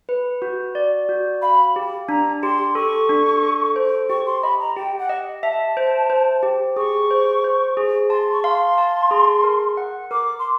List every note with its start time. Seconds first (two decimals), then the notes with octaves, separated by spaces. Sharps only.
0.09 B4
0.42 F#4
0.75 D5
1.09 F#4
1.42 F5 B5
1.76 G4
2.09 D4 A#5
2.43 G4 C6
2.75 A4 C#6
3.09 D4
3.43 A4
3.76 C5
4.10 G4 C#6
4.26 C6
4.43 D#5 B5
4.59 A#5
4.76 G4 G5
4.99 F#5
5.09 D#5
5.43 E5 A5
5.77 C5
6.10 C5
6.43 G4
6.76 G#4 C#6
7.11 C5
7.44 C5
7.77 G#4
8.10 A5 C6
8.33 C#6
8.43 F5 C6
8.78 A5
9.11 G#4
9.44 A#4
9.77 F#5
10.11 A#4 D6
10.39 C6